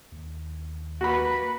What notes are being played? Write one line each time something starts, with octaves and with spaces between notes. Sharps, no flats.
D#2
A#3 F#4 B4 B5